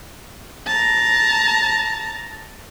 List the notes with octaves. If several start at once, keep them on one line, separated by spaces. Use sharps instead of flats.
A5 A#5